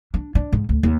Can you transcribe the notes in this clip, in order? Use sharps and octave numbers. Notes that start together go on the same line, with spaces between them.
D4
D4
G#2
D2
D#2